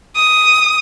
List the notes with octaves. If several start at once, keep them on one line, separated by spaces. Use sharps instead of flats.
D#6